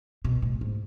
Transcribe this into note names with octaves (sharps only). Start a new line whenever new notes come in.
B2
A2
G#2